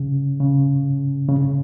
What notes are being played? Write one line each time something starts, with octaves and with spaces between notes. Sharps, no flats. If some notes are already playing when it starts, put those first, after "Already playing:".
Already playing: C#3
C#3
C#3